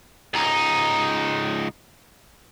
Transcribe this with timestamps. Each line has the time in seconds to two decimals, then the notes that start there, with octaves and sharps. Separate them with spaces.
0.34 C#2 D#4